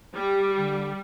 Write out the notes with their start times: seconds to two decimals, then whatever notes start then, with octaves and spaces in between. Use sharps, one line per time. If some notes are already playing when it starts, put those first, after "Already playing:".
0.15 G3 G4
0.57 D3